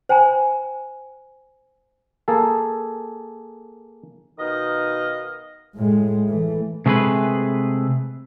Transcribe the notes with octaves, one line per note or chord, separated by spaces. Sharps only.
C5 G5 G#5 A#5 B5
A#3 G#4 A4 A5
B2 D#3 D#4 D#5 F5 D#6
A2 G#3
E3 A3
C3 G#3 A3 G#4 B4